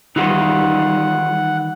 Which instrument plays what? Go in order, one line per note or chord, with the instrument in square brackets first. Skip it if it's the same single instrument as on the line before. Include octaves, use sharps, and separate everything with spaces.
[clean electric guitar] D#3 E3 [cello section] G3 [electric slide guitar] D#4 F4 G#4 [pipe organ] F#5